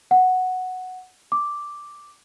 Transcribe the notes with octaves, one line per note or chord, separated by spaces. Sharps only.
F#5
D6